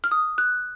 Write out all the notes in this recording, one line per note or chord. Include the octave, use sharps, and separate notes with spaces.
F6
D#6
F#6